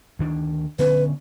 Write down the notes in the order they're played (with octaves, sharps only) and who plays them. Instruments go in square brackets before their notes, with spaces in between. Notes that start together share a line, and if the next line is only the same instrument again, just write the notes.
[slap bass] D2 D#3 D4
[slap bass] D3 B3 C#4 [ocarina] B4